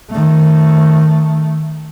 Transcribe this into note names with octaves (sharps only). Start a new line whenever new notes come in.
D#3 A3